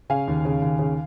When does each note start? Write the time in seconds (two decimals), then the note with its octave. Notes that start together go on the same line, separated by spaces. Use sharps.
0.10 C#3 F5 G#5
0.28 D#2
0.45 C#3
0.62 D#2
0.79 C#3